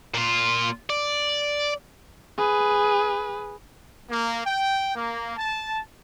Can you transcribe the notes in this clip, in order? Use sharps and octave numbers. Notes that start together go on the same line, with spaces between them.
A#2 F4
D5
G#4 B4
A#3
G5
A#3
A5